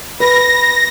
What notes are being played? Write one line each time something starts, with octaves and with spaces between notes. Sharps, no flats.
B4 B5 A#6